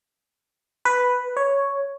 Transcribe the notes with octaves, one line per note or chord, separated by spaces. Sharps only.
B4
C#5